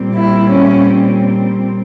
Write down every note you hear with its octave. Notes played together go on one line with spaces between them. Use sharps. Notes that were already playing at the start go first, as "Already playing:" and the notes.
Already playing: A#2 G3 C4
E4
C#4